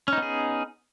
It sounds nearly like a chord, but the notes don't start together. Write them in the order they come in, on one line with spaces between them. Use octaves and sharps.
C#4 D#4 B3 G#4